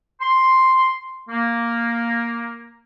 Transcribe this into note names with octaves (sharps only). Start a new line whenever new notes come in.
C6
A#3